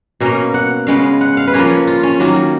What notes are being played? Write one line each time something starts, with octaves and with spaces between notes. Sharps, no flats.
B2 A#3 C#4 A#4
F#5
C#3 G#3 B3 F5
F#5
F5
B4
F3 A#3 C#4 C#5
F4
C#4
D#3 F#3 A#3